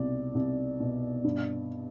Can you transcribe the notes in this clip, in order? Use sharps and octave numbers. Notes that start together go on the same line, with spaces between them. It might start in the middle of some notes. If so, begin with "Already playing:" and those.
Already playing: C2 B2 D5
C2
B2
G2